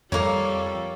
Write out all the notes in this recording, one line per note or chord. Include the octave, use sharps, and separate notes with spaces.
F2 G3 A#3 A4 C#5